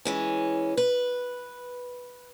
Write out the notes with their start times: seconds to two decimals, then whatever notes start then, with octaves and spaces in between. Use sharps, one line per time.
0.05 E3 G#3 C#4
0.77 B4